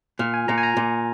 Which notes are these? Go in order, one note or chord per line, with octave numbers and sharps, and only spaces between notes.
A#2 F6
G#5
A#2 A#5
G#5
A#5
A#2